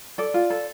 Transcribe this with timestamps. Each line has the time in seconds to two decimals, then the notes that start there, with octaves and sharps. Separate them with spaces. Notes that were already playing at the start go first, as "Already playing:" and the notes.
0.18 A4 D5
0.34 F4
0.50 A4